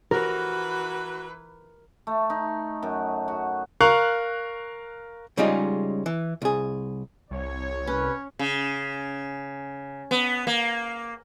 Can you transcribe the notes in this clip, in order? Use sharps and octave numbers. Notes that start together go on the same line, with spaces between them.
E3 F#4 A#4 B4
A3
D#4
F#2
F#4
A#4 F5 C#6 F#6
C#3 G3 G#3 C#4 D#4 F4
E3
C2 G#4
C2 C#5
C#4 B4
C#3
B3
A#3